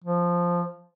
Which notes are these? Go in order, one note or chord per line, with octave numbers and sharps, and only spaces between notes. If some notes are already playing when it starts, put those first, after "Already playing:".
F3